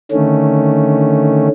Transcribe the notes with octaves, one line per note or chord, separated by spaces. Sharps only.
D3 D#3 A3 C#4